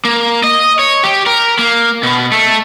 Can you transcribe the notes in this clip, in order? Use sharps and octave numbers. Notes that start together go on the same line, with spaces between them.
A#3
D#5
C#5
G4
A#4
A#3
B2
A3